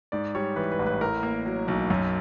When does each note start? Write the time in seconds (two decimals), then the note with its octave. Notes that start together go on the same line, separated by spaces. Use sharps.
0.12 G#2 D5
0.35 G3 C#5
0.56 E3 B4
0.72 B4
0.79 A1
0.86 B4
1.01 A2 A#4
1.23 A#3
1.46 F#3
1.68 B1
1.90 F#2